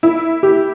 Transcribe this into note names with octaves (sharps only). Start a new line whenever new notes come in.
E4
G4